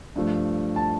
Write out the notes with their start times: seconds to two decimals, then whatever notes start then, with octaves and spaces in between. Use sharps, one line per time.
0.16 G2 F3 A3
0.76 A5